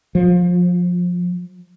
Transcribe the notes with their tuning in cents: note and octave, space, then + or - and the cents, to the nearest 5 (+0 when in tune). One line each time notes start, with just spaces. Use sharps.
F3 +25